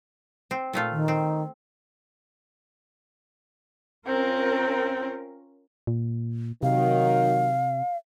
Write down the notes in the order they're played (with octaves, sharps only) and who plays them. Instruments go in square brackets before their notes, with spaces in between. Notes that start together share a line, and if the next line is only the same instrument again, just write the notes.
[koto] C4
A#2 A3 F4
[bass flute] D#3
[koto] C4
[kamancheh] C4 [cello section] C#4 F4 A#4
[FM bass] A#2
[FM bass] C3 [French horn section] D#3 F#3 [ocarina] F5